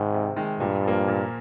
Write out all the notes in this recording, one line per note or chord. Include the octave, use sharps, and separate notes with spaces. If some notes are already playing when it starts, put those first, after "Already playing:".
Already playing: G#2 C3 D#3 G#3
C3
D#3 G#3
G2 A#2
F3 A#3
A#2